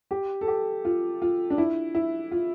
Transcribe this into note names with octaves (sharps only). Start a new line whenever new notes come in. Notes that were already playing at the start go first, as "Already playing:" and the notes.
G4
A4
G4
F4
F4
D4
E4
E4
F4